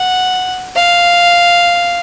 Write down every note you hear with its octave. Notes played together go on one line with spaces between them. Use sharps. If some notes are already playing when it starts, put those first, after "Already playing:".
Already playing: F#5
F5